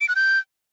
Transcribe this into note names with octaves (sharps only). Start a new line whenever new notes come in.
D7
F#6
G6